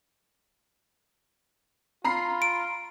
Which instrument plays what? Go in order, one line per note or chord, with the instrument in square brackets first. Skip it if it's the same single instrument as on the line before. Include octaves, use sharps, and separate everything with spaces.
[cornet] F4 [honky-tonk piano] A#5 B5 C7
[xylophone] D7